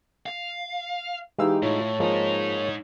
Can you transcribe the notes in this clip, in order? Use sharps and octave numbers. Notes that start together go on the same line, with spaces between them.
F5
E3 G#3 D#4 G4 F5 E6
A2 E4 F4 C#5
G#2 F3 G#3 A#3 D#4